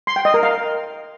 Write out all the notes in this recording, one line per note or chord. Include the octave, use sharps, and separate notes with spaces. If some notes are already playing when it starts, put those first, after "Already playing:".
C6
G5
D#5
A#4
F5